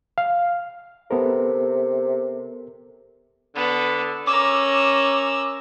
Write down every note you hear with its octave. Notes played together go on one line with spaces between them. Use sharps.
F5
C3 B3 A4 A#4
D3 B3 A4
C#4 A#4 D6 E6